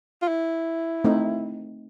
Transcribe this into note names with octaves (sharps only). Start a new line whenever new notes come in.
F4
E4
A3 C4 D#4